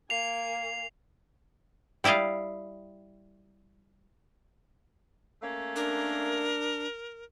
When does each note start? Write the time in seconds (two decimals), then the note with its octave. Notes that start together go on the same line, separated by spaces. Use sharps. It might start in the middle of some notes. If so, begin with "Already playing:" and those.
0.10 A#3 G#5 C7 F7
2.04 G3 E4 D5 D#5 F5
5.41 A3 A#3 C#4
5.76 D4 A#4